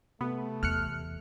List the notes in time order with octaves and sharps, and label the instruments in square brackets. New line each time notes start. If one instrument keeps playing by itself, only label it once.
[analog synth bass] C3 [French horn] A3 [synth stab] B3
[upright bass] E2 [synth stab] F6 F#6 C#7